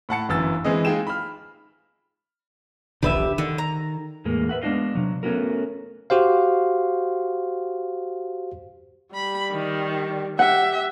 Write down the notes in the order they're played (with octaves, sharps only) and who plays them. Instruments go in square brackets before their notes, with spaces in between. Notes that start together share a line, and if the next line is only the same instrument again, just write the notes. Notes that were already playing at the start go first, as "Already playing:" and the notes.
[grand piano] A2 F#5 A5 C#7
G1 F#2 E3 E6 A6
E3 G#3 C4 G#4 D#5
G#3 D#4 F4 G#4 G5 E7
B5 F6
[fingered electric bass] D#1 A#1 D3 [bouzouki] G4 B4 E5
[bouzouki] D3 [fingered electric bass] D#3
[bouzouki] A#5
[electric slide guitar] E2 A2 G#3 A#3
B4 E5 F#5
G#3 B3 D4 D#4 D#5 F5
C3 F#3
A3 B3 C#4 E4 F#4 A#4
[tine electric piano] F#4 G4 C5 F5
[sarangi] G3 [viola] B5
[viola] D#3
[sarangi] G4 [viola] E5 [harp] F#5